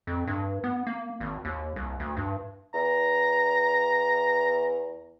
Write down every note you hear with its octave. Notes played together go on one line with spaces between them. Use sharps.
F2
G2
B3
A#3
G#1
D#2
C2
D2
G2
E2 A#5